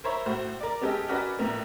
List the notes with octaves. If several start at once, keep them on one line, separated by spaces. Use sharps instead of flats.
A#4 C5 C#5 E5 B5
A2 F#4 C5
A#4 D5
G#3 B3 C#4 G4 A4 D#5
C#4 F#4 A#4 B4 D5 D#5
A#1 A2 B3 A#4